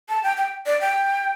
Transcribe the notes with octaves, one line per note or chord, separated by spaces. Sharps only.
A5
G5
G5
D5
G5